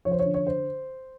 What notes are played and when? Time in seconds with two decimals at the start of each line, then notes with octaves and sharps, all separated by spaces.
0.05 F3 C#5
0.11 C5
0.19 C#5
0.25 D3
0.34 C#5
0.47 C5